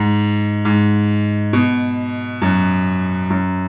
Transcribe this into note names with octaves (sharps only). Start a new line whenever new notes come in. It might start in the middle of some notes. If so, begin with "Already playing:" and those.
Already playing: G#2
G#2
B2
F#2
F#2